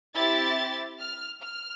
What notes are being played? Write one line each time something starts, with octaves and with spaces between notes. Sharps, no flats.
C4 E4 G4 A6
F6
F6